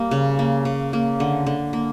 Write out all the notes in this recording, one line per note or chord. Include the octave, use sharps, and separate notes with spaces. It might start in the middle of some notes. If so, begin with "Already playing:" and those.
Already playing: G3 A#3
C#3
A#3
C#3
A#3
D3
D3
A#3